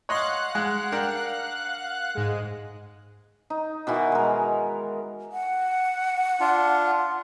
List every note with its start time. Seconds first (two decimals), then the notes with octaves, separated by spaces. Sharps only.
0.09 C#5 D#5 F5 F#5 C6 F#6
0.55 G#3
0.92 D4 A#4 G5
2.15 G#2 G#3
3.50 D#4
3.87 B2 D#3 E3 F#5
4.12 G#3 A#4
5.32 F#5
6.40 D4 F4